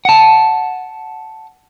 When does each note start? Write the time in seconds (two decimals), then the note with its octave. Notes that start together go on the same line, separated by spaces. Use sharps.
0.05 F#5 A5